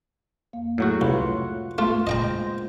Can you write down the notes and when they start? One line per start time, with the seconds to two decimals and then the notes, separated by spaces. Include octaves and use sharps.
0.53 F2 A#3 F5
0.78 A2 F#3 A3 F#4 G#4
1.01 C2 F4 B4 F5 F#5
1.78 A2 A3 B3 F4
2.07 A#2 C#3 G#3 C5 D#5 G5 A#5